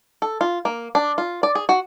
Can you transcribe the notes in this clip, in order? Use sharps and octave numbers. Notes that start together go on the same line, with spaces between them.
A4
F4
A#3
D4
F4
D5
G#4
F#4